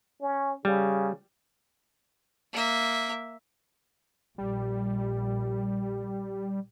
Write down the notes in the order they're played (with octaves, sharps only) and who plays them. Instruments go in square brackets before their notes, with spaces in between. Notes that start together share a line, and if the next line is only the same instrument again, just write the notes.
[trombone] C#4
[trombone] C#3 [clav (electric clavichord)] G3
[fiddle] A#3 E5
[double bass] A#1 [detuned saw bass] G3